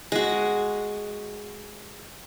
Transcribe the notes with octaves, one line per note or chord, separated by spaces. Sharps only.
G#3 F#4